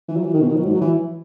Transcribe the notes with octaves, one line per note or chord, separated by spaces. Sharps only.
E3
F#3
E3
D#3
B2
D#3
F#3
G#2
F#3
E3